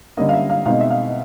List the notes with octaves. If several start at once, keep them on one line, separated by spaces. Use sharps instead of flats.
D3 G3 A#3 C#4 D#5
F5
E5
F5
B2 G#3 C4 D#4 F5
E5
F5